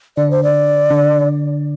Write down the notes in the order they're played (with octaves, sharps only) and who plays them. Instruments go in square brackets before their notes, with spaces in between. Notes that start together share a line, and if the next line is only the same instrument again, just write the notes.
[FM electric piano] D3 D4 [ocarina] D5
[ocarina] C5
D5
[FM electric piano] D3 D4